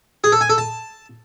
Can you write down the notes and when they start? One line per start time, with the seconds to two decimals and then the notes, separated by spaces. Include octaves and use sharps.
0.24 G#4
0.32 A4
0.41 G#5
0.49 A4
0.58 A5